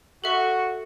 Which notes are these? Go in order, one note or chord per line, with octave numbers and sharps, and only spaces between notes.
F#4 A4 E5 C#6